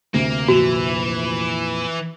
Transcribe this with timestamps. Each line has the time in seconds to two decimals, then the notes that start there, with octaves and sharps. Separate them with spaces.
0.14 D2 C3 A#3
0.48 F2 A#2 E3 F#4